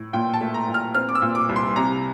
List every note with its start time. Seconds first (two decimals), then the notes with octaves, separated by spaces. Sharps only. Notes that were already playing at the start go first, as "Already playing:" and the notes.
Already playing: A2
0.13 A#2 G5
0.34 A5
0.41 A3
0.54 A#5
0.68 A#2
0.74 F6
0.94 C4 F6
1.09 D6
1.15 E6
1.22 A#2
1.35 D6
1.49 C2
1.56 C6
1.76 C3 A#5